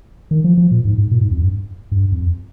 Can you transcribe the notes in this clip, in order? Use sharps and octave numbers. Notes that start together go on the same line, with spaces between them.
D#3
F3
F3
A#2
G#2
G#2
A#2
G#2
F2
G2
G2
F2